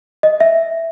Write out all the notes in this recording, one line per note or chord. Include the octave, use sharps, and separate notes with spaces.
D#5
E5